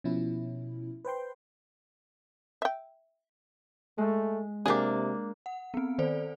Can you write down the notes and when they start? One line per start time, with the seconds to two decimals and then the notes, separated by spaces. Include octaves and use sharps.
0.04 B2 F3 C#4 E4
1.05 B4 C5 G5 C6
2.62 E5 G5
3.98 G#3 A3
4.66 C3 A#3 D4 G4 G#4
5.46 F#5
5.74 B3 C4
5.98 D#3 A4 C5 D5